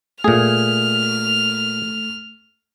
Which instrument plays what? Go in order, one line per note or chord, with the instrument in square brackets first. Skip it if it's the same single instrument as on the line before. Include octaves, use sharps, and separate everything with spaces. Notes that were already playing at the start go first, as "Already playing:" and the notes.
[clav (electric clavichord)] A#2 G#4 [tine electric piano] A3 [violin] F6